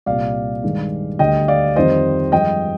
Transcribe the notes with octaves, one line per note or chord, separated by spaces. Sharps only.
C2 A#2 G3 D5 F5
G2 D#3 G#3
D2 D3 G3 D#5 G5
D5 F5
F2 D#3 G3 C4 C5 D#5
G2 F3 G#3 D#5 G5